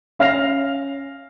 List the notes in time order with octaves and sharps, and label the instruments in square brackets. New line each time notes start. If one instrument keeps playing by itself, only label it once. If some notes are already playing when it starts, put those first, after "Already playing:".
[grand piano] C#4 F5 F6 A#6 C7 F7